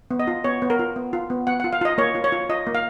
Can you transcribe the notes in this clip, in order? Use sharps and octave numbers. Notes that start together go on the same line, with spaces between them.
B3
D#5
F4
B3 C#5
B3
A#4
F4
B3
F4
B3
B3 F#5
F#5
F4
F5
F4 D#5
A#3 C#5
F4
C#5
F4
F4 D#5
A#3
F5